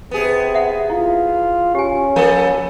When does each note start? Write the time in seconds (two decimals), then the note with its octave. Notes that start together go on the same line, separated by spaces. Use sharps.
0.11 C3 B3 G#4
0.55 E5 F#5
0.90 E4 F4
1.75 C#4 G4 G#5
2.16 F3 A#3 A4